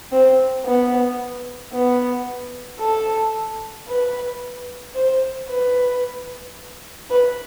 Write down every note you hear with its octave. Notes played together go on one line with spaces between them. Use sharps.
C4
B3
B3
A4
B4
C5
B4
B4